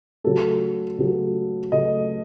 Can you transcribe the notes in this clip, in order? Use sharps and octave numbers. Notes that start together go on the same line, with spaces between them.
C#3 F#3 A3 A4
C#3 F#3 A3
C#3 F#3 A3 D#5